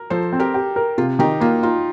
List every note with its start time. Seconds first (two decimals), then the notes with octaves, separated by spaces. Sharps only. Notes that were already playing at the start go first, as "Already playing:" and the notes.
Already playing: A#4
0.10 F3 A4 C5
0.33 C4
0.40 G4 A#4
0.54 G4
0.76 A#4
0.98 C3 F4
1.19 D#3 D#4 G4
1.41 A#3 F4
1.63 D#4 F4